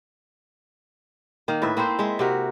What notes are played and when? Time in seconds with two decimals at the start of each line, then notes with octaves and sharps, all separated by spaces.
1.48 D#3 A#3
1.62 A2 B4 E5
1.77 A#3 C4 E4 C5
1.99 G#3 E5
2.19 C3 F#4 A#4